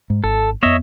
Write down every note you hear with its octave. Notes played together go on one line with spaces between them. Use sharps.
G#2
G#1 A4
F2 B3 C#5 D#5 E5